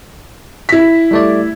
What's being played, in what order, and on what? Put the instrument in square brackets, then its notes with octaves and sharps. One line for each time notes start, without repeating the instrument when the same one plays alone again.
[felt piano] E4 B6
[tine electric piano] G3 A3 D5